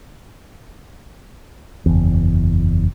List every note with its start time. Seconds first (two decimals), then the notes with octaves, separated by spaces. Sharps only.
1.86 F#1 E2